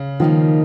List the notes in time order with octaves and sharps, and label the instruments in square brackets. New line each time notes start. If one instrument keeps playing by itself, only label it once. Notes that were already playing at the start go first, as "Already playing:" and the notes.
Already playing: [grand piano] C#3
[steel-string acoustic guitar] D#3 G3 A#3 D#4 [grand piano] F3